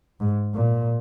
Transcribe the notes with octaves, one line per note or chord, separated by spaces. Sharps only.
G#2
A#2